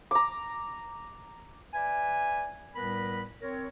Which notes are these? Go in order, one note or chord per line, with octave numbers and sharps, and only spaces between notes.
A#5 D6
B4 D5 E5 G#5
A2 G3 B3 A#4 B4 B5
C4 A#4 C#5